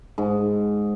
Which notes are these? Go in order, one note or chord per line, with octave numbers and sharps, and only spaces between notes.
G#2